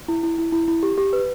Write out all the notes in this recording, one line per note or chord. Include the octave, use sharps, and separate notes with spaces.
E4
E4
E4
E4
E4
G4
G4
B4